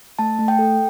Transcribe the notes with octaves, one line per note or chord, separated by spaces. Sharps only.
A3 A5
A3
G5
A4